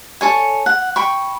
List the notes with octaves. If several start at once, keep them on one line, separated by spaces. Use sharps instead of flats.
A4 C#5 G#5
F#5
G5 B5 C#6